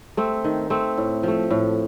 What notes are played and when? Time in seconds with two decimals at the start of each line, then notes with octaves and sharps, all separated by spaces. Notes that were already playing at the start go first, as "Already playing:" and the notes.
0.17 A3 C4
0.44 D#3
0.70 A3 C4
0.97 A2
1.23 F3 A3
1.51 A2